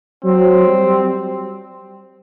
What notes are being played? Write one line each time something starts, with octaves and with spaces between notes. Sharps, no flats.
F#3 C4
G3